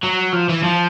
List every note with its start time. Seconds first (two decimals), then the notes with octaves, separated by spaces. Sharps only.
0.04 F#3
0.34 F3
0.50 E3
0.64 F3